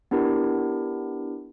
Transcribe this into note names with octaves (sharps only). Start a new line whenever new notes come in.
B3 D4 E4 G4 A#4